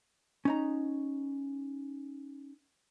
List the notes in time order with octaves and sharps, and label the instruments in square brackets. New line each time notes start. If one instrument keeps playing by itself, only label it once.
[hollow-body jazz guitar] C#4 D#4 A#5